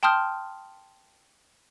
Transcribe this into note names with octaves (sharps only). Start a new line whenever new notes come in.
G5 A5 C6 D#6 F6 G6